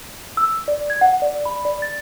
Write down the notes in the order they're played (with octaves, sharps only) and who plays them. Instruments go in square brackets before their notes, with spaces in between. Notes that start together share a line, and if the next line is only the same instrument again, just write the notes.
[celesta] E6
D5
G#6
F#5
D5
B5
D5
A6